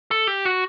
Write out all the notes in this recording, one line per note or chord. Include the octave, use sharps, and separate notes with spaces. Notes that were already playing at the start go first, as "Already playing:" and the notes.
A4
G4
F#4